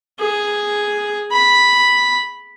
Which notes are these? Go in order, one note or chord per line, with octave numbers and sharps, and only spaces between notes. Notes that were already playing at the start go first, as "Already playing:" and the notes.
G#4
B5